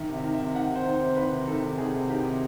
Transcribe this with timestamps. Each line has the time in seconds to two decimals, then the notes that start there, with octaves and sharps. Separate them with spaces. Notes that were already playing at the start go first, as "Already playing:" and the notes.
Already playing: D#3 E5
0.09 C3
0.14 E5
0.24 D#3
0.34 E5
0.40 C3
0.55 D#3 F#5
0.70 C3
0.75 C5
0.86 D#3
0.96 C3 C5
1.17 D#3 B4
1.32 C3
1.47 D#3 A4
1.63 C3
1.78 D#3 G#4
1.94 C3
2.10 D#3 G4
2.25 C3